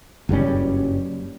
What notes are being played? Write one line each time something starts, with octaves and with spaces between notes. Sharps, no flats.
F#1 G2 G3 C#4